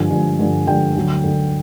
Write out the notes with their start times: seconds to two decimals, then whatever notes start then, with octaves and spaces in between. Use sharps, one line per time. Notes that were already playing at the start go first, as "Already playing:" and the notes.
Already playing: G2 D3 F3 G#5
0.10 G2 D3 F3
0.39 G2 D3 F3
0.67 G2 D3 F3 G5
0.96 D2 D3 F#3
1.24 D2 D3 F#3